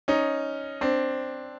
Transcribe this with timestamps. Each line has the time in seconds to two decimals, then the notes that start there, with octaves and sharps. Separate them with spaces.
0.08 C#4 D#4
0.81 C4 D4